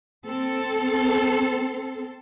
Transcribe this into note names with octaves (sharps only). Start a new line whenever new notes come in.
C4 A4